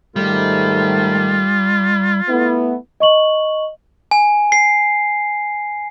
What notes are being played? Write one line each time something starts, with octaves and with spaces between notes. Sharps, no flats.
G#2 D#3 G3 A3 F4
A3 B3 E4
D#5 C#6 F#7
G#5
C7